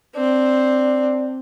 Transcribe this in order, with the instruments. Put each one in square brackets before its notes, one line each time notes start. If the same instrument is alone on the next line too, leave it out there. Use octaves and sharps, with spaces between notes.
[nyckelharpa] C4 [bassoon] D4